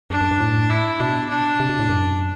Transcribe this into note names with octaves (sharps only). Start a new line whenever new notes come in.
F#2 D4
F#2
G2
A2
E4
B2 D4
D4
C3
B2
A2
F#2